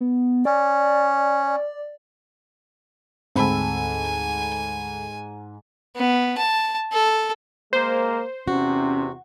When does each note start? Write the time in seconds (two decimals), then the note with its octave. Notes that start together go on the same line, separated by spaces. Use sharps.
0.01 B3
0.45 C#4 D5
3.36 D2 G#2 C4 A4 G#5 B5
5.96 B3
6.38 A5
6.92 A4
7.73 G#3 A#3 C5
8.48 E2 C3 C#4 F#4